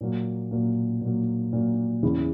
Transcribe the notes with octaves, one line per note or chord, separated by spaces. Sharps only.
A#2 F#3 A#3
A#2 F#3 A#3
A#2 F#3 A#3
A#2 F#3 A#3
E2 C#3 E3